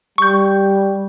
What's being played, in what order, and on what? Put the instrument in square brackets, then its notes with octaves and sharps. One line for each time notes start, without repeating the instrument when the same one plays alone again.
[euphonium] G3 [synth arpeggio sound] C#6 G6